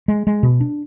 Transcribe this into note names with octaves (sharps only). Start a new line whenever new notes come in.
G#3
G#3
B2
D4